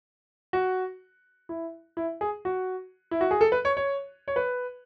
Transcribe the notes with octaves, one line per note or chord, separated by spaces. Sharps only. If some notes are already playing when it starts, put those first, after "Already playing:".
F#4
E4
E4
G#4
F#4
E4
F#4
G#4
A4
B4
C#5
C#5
C#5
B4